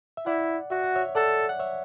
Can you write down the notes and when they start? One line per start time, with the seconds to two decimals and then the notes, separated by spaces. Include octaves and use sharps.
0.17 E5
0.26 E4 D5 F#5
0.70 F#4 E5
0.84 F#5
0.96 C#5 E5
1.15 A4 D5 F#5
1.49 F#5
1.59 C#5 E5